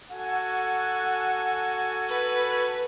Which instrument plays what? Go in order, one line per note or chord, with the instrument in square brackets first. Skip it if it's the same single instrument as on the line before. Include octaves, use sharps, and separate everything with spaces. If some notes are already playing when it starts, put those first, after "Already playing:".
[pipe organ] F#4 A4 G#5 [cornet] F#5
[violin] B4